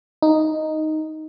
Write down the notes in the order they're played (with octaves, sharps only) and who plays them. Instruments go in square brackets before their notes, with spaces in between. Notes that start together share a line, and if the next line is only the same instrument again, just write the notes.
[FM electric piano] D#4